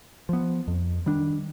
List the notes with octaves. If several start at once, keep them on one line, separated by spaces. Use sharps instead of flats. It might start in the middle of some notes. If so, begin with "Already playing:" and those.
F3 B3
F2
D#3 G3 D4